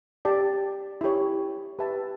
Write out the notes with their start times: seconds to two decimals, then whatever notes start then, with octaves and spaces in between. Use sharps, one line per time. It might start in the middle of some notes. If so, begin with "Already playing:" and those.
0.25 G4 D5 A5
1.01 E4 G4 C#5
1.79 G4 B4 E5 A5